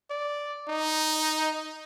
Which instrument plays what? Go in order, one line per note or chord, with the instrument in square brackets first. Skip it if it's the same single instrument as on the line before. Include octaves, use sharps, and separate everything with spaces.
[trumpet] D5
D#4